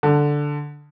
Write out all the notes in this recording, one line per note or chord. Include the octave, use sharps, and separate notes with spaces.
D3